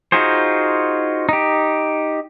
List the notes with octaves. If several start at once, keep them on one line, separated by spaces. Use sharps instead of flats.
D#4 F4 F#4 G#4 C5
D#4 G4